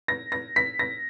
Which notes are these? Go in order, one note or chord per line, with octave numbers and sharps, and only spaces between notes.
A#6
A#6
B6
A#6